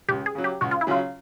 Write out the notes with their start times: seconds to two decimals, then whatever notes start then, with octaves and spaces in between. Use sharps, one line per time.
0.09 C#2 G4
0.26 G#4
0.35 C#3 F#3
0.44 G4
0.61 C#2 F#4
0.71 F4
0.81 E4
0.87 C#3 F#3 F4